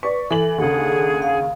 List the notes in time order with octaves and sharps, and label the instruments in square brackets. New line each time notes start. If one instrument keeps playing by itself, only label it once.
[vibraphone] B4 [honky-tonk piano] D5 C#6
[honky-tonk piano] E3 F#7 [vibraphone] A4
[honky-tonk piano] D#2 C#3 [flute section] D4 G#4 F#5
[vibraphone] F5